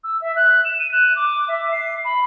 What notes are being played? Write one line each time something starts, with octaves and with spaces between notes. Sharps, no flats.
E6
E5
F#6
E7
D#7
F#6
D6
E5
C7
B5